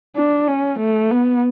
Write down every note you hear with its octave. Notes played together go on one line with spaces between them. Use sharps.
D4
C#4
A3
B3